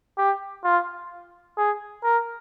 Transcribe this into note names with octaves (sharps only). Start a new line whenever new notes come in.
G4
F4
G#4
A#4